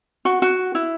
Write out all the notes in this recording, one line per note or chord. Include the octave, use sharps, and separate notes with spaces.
F#4
F#4
E4